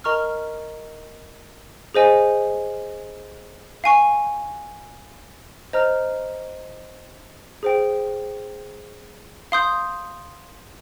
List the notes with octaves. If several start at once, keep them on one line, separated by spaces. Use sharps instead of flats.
A#4 D#5 A#5 C#6 F6
G#4 C5 D#5 G#5
F5 G#5 C#6
C5 D#5 A#5 F6
G#4 C5 G5
F5 C6 D#6 G6